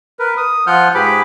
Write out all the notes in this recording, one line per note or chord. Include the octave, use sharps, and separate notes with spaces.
A#4 B4
D#6
F3 F4 F#5 F6 G6
G#2 G4 G#4 B4 B5 D6